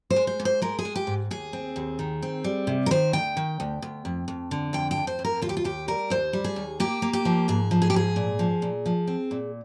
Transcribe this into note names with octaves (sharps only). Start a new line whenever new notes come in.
C5
G#3
C5
G#2
C5
G#3 A#4
G#4
G#3
G4
G#2
D#2 G#4
C4
D#2
D#3
C4
G3
C3
A#4
D#3 C5
D2 G5
D#3
D2
D2
F2
F2
D3
F2 G5
G5
F2
C5
F2
A#4
D#2 F4
G4
F4
D#2 G4
G3 A#4
D#2 C5
G3
G#4
D#2
A#3 G4
A#3
G4
F3
G#2 G#4
F3
G#4
G4
G#2 G#4
A#2
F3
A#2
F3
C4
A#2